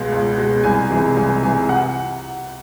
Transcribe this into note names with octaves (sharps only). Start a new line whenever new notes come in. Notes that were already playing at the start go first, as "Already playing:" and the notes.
Already playing: C#2 B2 G#3
C#2
B2 G#3
C2 G#5
C3 E3 G#3 G#5
C2 G#5
C3 E3 G#3 G#5
F#5